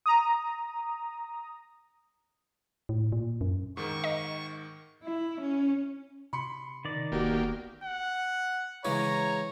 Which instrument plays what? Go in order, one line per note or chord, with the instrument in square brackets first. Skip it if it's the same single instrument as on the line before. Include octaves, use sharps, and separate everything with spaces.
[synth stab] A#5 D#6
[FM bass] A2
A#2
F#2
[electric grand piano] G#2 D#3 [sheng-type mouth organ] C#6
[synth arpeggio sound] D#5
[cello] E4
C#4
[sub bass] C3 [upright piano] B5 C6 C#7
[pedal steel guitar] D#3 D5
[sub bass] F1 [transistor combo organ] A#3 G4 [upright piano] B3 F#4
[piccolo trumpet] F#5
[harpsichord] C#3 E3 G#3 [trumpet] C#5 [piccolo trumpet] A#5